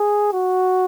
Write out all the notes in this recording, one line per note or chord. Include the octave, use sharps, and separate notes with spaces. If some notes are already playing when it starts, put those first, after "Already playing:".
Already playing: G#4
F#4